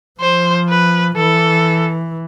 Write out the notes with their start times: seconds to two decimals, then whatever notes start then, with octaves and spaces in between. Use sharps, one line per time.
0.20 F3 C5
0.68 B4
1.16 E3 A4